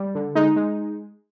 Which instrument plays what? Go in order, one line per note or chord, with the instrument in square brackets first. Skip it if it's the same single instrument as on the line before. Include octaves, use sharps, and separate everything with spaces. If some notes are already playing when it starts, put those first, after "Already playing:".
Already playing: [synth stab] G3
D3
G#3 D#4
G#3